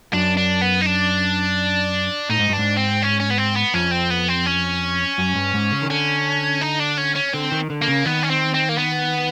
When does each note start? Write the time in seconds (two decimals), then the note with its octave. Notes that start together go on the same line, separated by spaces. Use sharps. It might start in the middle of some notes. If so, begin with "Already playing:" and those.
0.13 F#2 D4
0.37 D4
0.61 B3
0.81 D#4
0.86 D4
2.29 A2 D#4
2.39 G#2
2.49 G2 D4
2.59 G#2
2.77 C4
3.02 C#4
3.20 C#4
3.30 B3
3.38 C4
3.56 B3
3.74 F2 C#4
3.91 C4
4.10 B3
4.28 C4
4.46 C#4
5.18 F#2
5.35 G2
5.54 G#2
5.72 C#3
5.82 D#3
5.89 D3 C#4
6.62 D#4
6.80 D4
6.98 C#4
7.16 C#4
7.34 D3 C4
7.52 D#3
7.70 D3
7.82 A#3
7.88 C#3
8.06 D#3 B3
8.23 C#4
8.30 C4
8.54 C4
8.69 A#3
8.78 B3